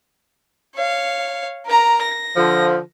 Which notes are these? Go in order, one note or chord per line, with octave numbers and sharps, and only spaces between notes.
C#5 F5
A#4 A#5
A#6
D3 F3